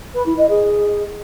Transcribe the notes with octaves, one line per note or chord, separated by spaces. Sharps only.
B4
E4
D#5
G#4